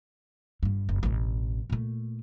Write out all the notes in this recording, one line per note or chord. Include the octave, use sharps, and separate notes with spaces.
G1 G2
F#1
E1 A1
A#2 A3